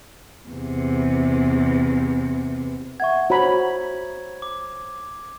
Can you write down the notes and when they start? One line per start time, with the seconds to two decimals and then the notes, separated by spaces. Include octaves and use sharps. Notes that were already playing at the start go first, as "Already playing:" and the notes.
0.49 E2 C3
3.00 E5 F#5 C#6 G#6
3.30 F#4 C5 C#5 A#5 B5
4.42 D6